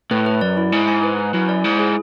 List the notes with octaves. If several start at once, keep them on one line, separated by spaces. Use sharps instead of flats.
A2 B4
B4
F#2 D5
E4
G#2 E4
G#5
B4
B4
F#2 E4
D5
G#2 E4
G#4